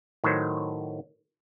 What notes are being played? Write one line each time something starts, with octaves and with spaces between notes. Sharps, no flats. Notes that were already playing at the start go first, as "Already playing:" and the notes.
A2 D#3 F#3 C5